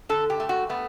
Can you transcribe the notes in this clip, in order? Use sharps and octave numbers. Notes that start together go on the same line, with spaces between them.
D3 A4
G4
A3
F#4
A3 B3